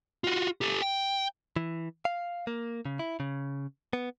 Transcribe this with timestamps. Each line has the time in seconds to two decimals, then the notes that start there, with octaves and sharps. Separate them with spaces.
0.24 F4 F#4
0.61 G4 A4
0.82 G5
1.56 E3
2.05 F5
2.47 A#3
2.85 C#3
2.99 E4
3.20 C#3
3.93 B3